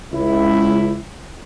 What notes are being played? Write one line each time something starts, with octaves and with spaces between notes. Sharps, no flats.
C#2 E4